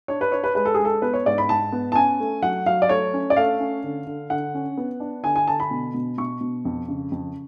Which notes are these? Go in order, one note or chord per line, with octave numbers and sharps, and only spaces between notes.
D4 C#5
B4
D4 C#5
B4
G#3 B4
A4
G#3 G#4
A4
B3 B4
C#5
G#2 D5
B5
G#2 A5
B3
A5
C#4 G#5
A3
F#3 F#5
F#3 F5
D5
A3 C#5
C#4
D5
A3 F5
C#4
D3
D3
D3 F#5
C#4
B3
D4
D3 G#5
G#5
D3 A5
B5
B2
B2
B2 C#6
B2
F2
C#3
F2